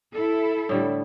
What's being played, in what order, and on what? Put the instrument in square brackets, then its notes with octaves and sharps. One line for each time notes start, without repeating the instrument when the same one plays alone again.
[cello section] E4 A4
[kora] A2 D3 G3